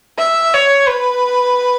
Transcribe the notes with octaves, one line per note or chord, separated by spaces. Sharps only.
E5
C#5
B4